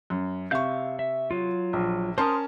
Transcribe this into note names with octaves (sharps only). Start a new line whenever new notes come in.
F#2
C3 E5 F5 C#6 G6
E5
F#3 F4
A#1
C#4 A#4 C5 A5 C6 D#6